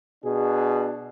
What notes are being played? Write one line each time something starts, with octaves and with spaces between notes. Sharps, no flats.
B2 D4 G#4